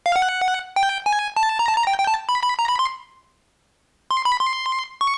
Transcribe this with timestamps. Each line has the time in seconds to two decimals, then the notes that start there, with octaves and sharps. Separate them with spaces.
0.06 F5
0.16 F#5
0.76 G5
1.06 G#5
1.36 A5
1.59 A#5
1.68 A5
1.77 A#5
1.87 G5
1.98 G5
2.07 A5
2.29 B5
2.43 B5
2.59 A#5
2.69 B5
2.79 C6
4.11 C6
4.25 B5
4.40 C6
5.01 C#6